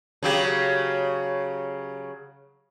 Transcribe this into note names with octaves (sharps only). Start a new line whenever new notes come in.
C#3 F#3 G4